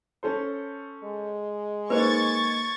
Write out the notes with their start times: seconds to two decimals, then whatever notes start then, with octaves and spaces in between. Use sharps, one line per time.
0.23 C#4 A4 C5
1.04 G#3
1.90 A#3 D#4 B4 C5 C#6 G#6 A6